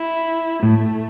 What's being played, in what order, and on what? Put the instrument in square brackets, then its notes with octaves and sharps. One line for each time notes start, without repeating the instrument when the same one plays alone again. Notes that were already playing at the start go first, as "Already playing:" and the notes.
Already playing: [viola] E4
[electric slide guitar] A2 [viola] A3